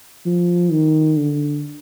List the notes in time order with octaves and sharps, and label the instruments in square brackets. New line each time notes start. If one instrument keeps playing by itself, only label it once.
[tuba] F3
D#3
D3